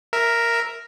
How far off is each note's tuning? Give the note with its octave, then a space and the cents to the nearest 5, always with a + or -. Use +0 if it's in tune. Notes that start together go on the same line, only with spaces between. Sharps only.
A#4 +0 E5 +0